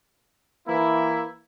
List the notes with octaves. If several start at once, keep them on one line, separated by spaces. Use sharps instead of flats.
E3 A#3 E4